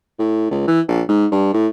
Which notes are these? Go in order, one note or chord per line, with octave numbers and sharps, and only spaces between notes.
A2
C#2
E3
A#1
G#2
G2
A2